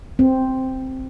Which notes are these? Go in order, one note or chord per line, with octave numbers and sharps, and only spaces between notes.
C4